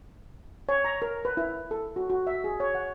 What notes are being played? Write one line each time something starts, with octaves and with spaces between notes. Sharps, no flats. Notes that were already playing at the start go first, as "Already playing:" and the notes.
C#5
A#5
A#4
B4
E4
A4
F#4
F#4
E5
G#4
C#5
F#5